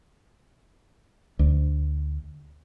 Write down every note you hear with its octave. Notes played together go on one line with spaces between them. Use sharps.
D2